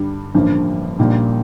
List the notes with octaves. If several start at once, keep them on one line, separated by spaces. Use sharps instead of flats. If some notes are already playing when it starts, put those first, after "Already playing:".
Already playing: G2 D3 G3
A1 G2 D3 F3 A#3
A#1 A#2 G3 A#3 D#4